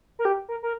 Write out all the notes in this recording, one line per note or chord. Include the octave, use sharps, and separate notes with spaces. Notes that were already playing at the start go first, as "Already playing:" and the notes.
A#4
G4
A#4
A#4